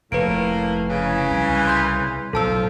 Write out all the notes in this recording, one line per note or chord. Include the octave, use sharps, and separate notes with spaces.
F1 A2 A#3 B4 D7
C#3 E3
C2
C6 G6 B6
B1 A2 F3 A4 A5 E6